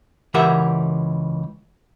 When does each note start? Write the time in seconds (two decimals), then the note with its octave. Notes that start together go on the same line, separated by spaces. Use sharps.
0.34 C#2 E3 G4 A#4 E5 F#5